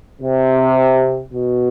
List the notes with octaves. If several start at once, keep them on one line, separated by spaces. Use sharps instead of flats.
C3
B2